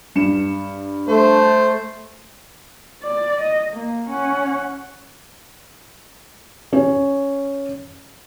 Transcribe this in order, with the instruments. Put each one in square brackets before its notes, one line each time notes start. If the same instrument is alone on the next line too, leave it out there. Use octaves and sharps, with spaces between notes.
[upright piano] G2 C#7 E7
[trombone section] A3 [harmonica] C5
[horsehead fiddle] D5
D#5
A#3
C#4 F#5
[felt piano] C#4